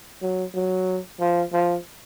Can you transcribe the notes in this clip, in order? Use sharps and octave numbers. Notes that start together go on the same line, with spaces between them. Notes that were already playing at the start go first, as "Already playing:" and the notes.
F#3
F#3
F3
F3